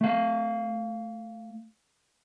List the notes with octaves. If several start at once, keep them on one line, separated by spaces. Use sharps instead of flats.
A3 F5